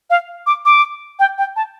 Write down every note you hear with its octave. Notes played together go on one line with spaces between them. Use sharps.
F5
D6
D6
G5
G5
A5